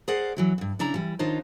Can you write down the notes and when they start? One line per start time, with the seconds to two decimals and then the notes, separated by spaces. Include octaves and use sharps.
0.08 G#4 A#4 C5 D5 F#5
0.37 E3 F#3 E4
0.58 D2 G2
0.79 C#3 D4 E4 A#5
0.94 E3 G3
1.19 D#3 D4 D#4 F4 C5 C#5